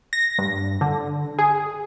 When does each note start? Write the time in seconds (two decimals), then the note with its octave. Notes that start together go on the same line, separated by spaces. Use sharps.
0.13 A#6
0.38 G2
0.81 D3
1.39 G#4